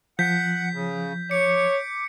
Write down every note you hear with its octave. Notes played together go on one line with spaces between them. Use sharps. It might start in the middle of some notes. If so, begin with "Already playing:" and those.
F3 F#5 G6 B6
C#3
C#5 D6 C#7